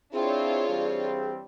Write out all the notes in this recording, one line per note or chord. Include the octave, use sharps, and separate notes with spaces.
C4 D4 E4 F4 G#4 C#5
E3 G3 C4